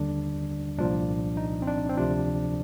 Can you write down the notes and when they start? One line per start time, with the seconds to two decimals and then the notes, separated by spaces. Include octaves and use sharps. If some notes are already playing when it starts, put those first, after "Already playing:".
Already playing: D#2 D3 G3 D4
0.78 C2 A#2 F3 D4
1.37 D#4
1.62 C4
1.67 D4
1.89 C4
1.97 D2 C3 F3 D4